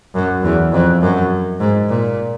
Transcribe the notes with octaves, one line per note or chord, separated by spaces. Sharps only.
F#2
E2
F2
F#2
G#2
A#2